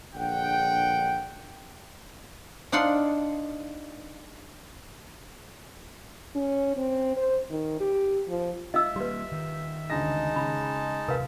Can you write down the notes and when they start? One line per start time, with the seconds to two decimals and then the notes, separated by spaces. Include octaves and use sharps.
0.15 A#1 D3 F#5 G5
2.72 D4 D#4 F4 F#5 C6
6.35 C#4
6.76 C4
7.17 C5
7.51 D#3
7.80 G4
8.28 F3
8.74 F4 D#5 E5 E6
8.96 G3 G#3 A#3 G4 B4
9.32 D#3
9.90 D2 C#3 G#3 D#4 A5 A#6
10.36 C#3 B5
11.08 D#1 C3 A#4 B4 F5